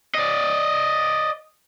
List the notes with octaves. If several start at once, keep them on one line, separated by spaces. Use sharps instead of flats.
D5 D#5